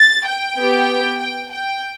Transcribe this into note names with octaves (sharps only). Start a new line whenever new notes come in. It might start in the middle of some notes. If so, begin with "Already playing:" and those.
Already playing: A6
G5
B3 G4
G5
G5